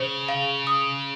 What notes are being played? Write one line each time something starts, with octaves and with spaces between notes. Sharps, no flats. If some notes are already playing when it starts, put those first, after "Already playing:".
Already playing: C#3 C5
F5
D#6